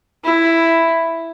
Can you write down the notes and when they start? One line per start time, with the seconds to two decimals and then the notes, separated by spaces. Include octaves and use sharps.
0.24 E4